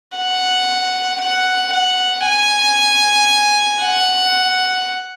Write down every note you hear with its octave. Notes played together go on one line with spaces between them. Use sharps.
F#5
F#5
F#5
G#5
F#5